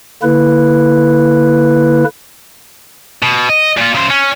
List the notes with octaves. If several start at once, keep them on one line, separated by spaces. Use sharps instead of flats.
D3 A#3 E4 B4
B2
D#5
A#2 F4
C#3 C5
C#4